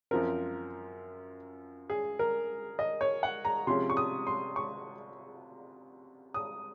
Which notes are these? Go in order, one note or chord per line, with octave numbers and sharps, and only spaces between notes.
F#2 F3 C4 A#4
G#4
A#4
D#5
C#5
F#5
A#5
C3 F3 G#3 C#4 C6
C#6
D#6
C6
C#6
D#6